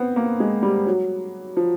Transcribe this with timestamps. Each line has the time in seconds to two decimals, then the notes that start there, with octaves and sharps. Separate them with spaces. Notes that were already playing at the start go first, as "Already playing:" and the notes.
Already playing: B3 C4
0.16 A#3
0.40 G#3
0.63 G3
0.87 F#3
1.57 F3